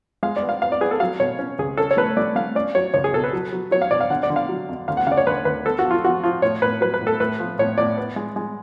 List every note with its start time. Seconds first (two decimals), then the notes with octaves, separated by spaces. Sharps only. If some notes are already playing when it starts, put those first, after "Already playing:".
0.23 G#3 F5
0.36 D5
0.43 B3
0.49 F5
0.62 B3 F5
0.72 D5
0.81 B3 G#4
0.91 A4
1.00 F#3 F5
1.20 B2 C#5
1.39 C#4
1.59 C#2 G#4
1.77 C#4 A4
1.91 C#5
1.97 A3 B4
2.17 A3 D5
2.36 A3 F5
2.55 C#4 D5
2.75 F#3 C#5
2.94 C#2 C#5
3.04 G#4
3.13 B2 A4
3.24 B4
3.33 F#3
3.53 F#3
3.71 F#3 C#5
3.82 F5
3.91 B2 D5
4.01 F5
4.10 D3 F#5
4.23 D5
4.30 D3
4.36 F5
4.49 F#3
4.69 F2
4.88 D2 F5
4.97 F#5
5.07 C#3 D5 F5
5.17 C#5
5.27 D2 B4
5.45 D2 B4
5.65 B3 A4
5.79 F#4
5.85 F3
5.91 F4
6.04 F3 F#4
6.24 F3 F4
6.42 A2 C#5
6.62 A2 B4
6.81 F#3 B4
6.94 B4
7.01 A2
7.07 A4
7.20 A2 B4
7.40 F3
7.58 A2 C#5
7.78 A2 D5
7.98 B3
8.16 G#3
8.36 G#3